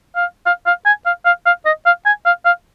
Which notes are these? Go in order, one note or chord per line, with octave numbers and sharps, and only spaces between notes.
F5
F5
F5
G#5
F5
F5
F5
D#5
F5
G#5
F5
F5